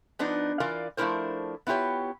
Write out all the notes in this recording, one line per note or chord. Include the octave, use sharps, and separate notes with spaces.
F3 B3 D4 D#4
E3 F4 A#4 D5 F5
F3 A3 D4 E4 A#4 C5
B3 E4 F4 G4 C#5